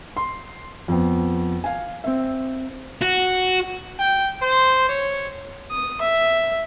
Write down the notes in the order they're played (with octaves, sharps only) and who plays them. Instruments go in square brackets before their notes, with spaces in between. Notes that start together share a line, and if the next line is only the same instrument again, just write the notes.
[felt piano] C6
F2 B3
F5 G#5
C4 E5
[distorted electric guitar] F#4
[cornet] G5
C5
C#5
[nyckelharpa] D#6
E5